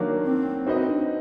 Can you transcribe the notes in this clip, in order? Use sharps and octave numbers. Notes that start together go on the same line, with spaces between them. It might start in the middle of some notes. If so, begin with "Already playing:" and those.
Already playing: D#3 F#3 A#3 D4
C4
C4 D#4 F#4 B4 D#5
D4